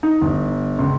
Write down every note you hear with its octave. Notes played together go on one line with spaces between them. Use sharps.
D#4
G1
C#2